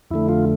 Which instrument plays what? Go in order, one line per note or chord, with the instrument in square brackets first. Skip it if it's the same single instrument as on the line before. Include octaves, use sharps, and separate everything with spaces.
[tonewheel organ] F2 D3 A3 E4
F4